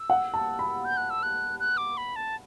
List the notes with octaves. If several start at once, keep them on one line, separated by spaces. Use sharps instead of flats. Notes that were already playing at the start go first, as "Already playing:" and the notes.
Already playing: E6
F#5
A5
B5
G6
F#6
E6
F#6
F#6
D6
B5
A5